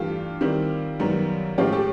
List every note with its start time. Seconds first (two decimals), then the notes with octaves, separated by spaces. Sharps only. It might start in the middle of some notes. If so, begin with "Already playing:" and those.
Already playing: G2 E3 A3 F4 G4
0.41 D#3 G3 C4 E4
0.99 F#2 D#3 G3 B3 D#4
1.58 A2 F3 G#3 C#4 F4 G4
1.72 G4 A4